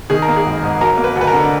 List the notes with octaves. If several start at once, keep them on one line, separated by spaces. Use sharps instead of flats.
D#3 G#4
A#4
A#3
G#4
G#1
G#2
F#3 A#4
A#3
B4
D2
B4
A#4
D3